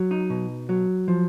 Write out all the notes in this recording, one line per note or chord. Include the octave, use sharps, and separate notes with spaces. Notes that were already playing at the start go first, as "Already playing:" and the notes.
Already playing: F#3
D#4
B2
F#3
F3